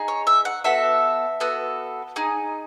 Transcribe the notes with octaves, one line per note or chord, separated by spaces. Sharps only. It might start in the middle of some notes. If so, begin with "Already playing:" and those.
Already playing: D#4 G#4
C#5
E5
F#5
B3 F#4 A4 E5
B3 F#4 A4
D#4 G#4